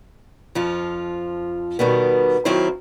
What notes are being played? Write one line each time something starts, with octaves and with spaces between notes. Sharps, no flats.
F2 F3 F4
B2 D#3 G3 B3
D#3 F#3 C4 E4 F4 C5